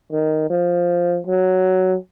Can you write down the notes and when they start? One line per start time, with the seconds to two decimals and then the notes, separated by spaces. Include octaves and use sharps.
0.12 D#3
0.50 F3
1.27 F#3